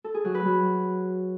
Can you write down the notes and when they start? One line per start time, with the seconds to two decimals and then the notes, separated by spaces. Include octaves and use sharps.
0.04 A4
0.14 G#4
0.25 F#3
0.35 B4
0.45 F#3